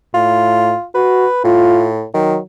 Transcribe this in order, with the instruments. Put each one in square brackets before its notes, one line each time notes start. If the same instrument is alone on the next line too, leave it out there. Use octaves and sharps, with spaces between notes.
[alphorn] A2 [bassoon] F4
[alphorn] F#4 [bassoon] B4
[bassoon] A2 [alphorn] F4
[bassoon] D#3 [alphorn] F#3